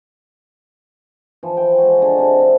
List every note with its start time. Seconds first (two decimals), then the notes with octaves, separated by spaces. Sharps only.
1.43 E3 F3
1.57 G5
1.78 G#3 F#4
1.98 D3 G#4
2.19 C3 A4
2.39 E5